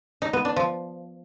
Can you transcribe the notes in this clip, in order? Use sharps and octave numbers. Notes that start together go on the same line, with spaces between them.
D#4
B3
D4
F3